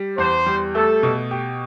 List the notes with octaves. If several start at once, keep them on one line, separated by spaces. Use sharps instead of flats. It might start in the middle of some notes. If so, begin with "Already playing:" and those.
Already playing: G3
E2 C5
G3
A3 A4
B2
G4